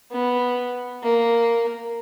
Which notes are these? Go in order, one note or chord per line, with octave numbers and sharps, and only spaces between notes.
B3
A#3